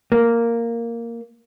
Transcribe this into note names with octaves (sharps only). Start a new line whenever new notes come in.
A#3